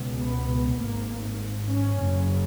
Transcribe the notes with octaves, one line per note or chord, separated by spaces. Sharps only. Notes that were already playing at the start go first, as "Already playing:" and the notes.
Already playing: C#2 B2
B3
G#1 G#2 A#3
C#4
F#1 F#2 C#3